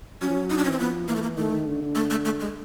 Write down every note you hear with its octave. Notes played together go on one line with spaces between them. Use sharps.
F#3 C#4
F3
F#3
D#4
D4
C#4
E3 C4
F3 B3
E3 A#3
A3
A#3
D#3 A3
D#3
D3
D3
A3
A3
A3
G#3